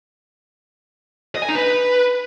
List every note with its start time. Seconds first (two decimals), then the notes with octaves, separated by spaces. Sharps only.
1.36 D#5
1.42 G#5
1.49 D#4
1.55 B4